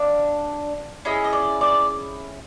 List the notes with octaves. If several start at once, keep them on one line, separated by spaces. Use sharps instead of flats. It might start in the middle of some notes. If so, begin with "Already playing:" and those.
Already playing: D4 F5
C#4 E4 G#4 D#5
D#5
D5
D5